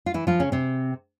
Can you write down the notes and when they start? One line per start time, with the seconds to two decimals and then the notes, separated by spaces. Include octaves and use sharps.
0.06 F4
0.14 E3 E4
0.27 F3 F4
0.40 C#3 C#4
0.52 C3 C4